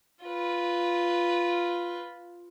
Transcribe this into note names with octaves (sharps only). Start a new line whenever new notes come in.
F4 B4